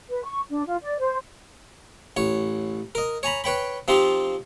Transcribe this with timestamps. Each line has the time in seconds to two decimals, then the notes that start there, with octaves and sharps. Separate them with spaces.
0.10 B4
0.24 C#6
0.49 D4
0.67 F4
0.82 D5
0.99 C5
2.17 A1 C#5
2.95 A#4 D#5
3.23 C#5 G#5 A#5 B5
3.44 B4 C#5 G5 B5
3.88 F3 C4 D#4 F4 G4